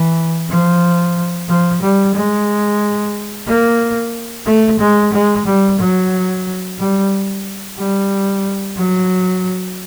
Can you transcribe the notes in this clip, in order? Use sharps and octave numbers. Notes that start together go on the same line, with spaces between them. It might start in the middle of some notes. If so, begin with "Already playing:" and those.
Already playing: E3
F3
F3
G3
G#3
A#3
A3
G#3
G#3
G3
F#3
G3
G3
F#3